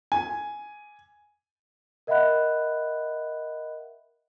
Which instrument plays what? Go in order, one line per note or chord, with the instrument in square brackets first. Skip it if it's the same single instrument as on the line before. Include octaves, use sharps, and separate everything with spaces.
[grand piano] G#5
[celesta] A#4 D#5 E5 F#5 B5 F#6